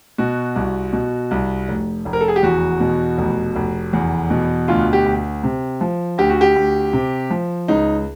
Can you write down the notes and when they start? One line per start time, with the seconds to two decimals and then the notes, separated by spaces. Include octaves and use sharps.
0.18 B2 F#4
0.56 C2
0.93 B2
1.31 C2
1.68 F1
2.05 F1
2.13 A#4
2.21 A4
2.28 G#4
2.36 G4
2.43 E2 F#4
2.80 B2
3.18 F1
3.55 F1
3.93 E2
4.30 B2
4.68 D2 F4
4.93 G4
5.06 D2
5.43 C3
5.81 F3
6.18 D2 G4
6.30 F#4
6.41 G4
6.56 D2
6.93 C3
7.31 F3
7.68 C#2 D#4